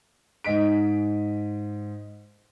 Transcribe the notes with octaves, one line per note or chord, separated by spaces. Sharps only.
G#2 D#5 B6 D7